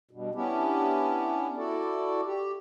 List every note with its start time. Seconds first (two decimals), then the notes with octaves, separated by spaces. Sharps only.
0.11 G2 B2
0.35 B3 C#4 D4 E4 G4
1.57 E4 F#4 A4 D5
2.25 G4